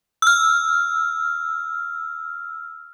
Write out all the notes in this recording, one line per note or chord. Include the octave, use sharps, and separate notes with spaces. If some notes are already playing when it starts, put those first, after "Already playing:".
E6 F6